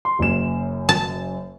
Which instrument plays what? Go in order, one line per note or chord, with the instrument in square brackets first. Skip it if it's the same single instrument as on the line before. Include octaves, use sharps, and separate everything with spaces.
[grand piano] C6
F#1 F#2 E7
[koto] A5